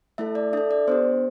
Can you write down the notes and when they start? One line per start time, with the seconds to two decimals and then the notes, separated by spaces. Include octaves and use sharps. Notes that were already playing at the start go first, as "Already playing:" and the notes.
0.18 A3 E4 A4 E5
0.35 D5
0.53 D4 E5
0.57 A4
0.71 D5
0.87 B3 D4 G4 C5